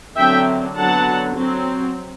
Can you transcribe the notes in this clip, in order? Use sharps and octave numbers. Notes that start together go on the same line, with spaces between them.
D3 F#3 C4 E5 G5
D3 F#3 B3 F#5 A5
F#3 C4